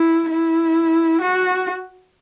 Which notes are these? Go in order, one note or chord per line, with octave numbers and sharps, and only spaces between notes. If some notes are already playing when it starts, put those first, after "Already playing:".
Already playing: E4
E4
F#4